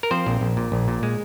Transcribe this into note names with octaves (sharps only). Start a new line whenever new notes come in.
A#4
F3 C4 C5
A#1
A#1
A#2
A#1
A#2
G#3